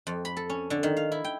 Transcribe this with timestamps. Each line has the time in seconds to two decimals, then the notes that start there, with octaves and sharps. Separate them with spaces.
0.07 F2
0.25 B5
0.37 A4
0.50 C#4
0.70 D3
0.83 D#3
0.97 F5
1.12 E4
1.24 G5